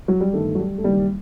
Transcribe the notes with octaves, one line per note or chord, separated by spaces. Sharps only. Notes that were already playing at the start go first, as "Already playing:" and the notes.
F#3
G3
G1 G2 D#3 A3
F#3
G3
A3
F#1 F#2 D#3 G3